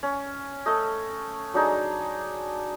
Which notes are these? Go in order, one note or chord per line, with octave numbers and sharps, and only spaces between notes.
C#4
A3 D#5
F#3 D4 D#4 G#4